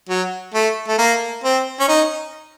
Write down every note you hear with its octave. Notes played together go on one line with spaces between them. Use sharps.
F#3
A3
A3
A#3
C4
C#4
D#4